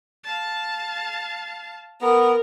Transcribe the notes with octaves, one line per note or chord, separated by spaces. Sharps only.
F5 A5
B3 A#4